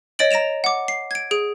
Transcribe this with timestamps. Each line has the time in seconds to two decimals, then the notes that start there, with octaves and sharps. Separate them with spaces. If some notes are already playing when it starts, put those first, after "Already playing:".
0.19 C#5 D#5 A6 D7 F#7
0.31 A#5 A#6 D7 E7 F7
0.64 F#5 D6
0.88 C7
1.11 G#6 D7
1.31 G#4 D7